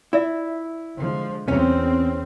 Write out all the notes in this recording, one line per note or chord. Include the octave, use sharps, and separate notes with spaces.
E4 F4 D5 E5
D3 F3 G#3
E2 C4 C#4